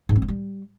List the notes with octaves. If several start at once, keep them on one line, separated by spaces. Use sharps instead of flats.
G#2
C4
F#3
G3